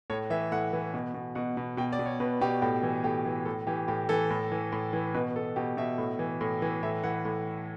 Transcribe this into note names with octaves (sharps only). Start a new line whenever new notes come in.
A2 C#5
E3 E5
A2 F#5
E3
B2
B2
B2 F#5
B2
B2 G5
D5
B2
C#5
B2 B4
B2 G4
A2 G4
E3
A2 G4
E3
A2 A4
E3 G4
A2 G4
E3 A4
A2
E3
A2
E3
B2 B4
B2 A4
B2 G4
B2 E5
A2
E3
A2
E3
A2 E5
E3 F#5
A2